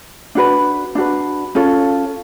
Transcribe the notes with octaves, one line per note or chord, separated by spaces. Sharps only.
D4 F#4 B4
D4 F#4 B4
C#4 F4 A4